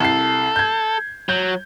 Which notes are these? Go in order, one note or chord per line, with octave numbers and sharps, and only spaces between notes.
C2 A4 C7
G6 G#6
F#3 G6